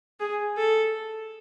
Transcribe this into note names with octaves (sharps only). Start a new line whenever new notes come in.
G#4
A4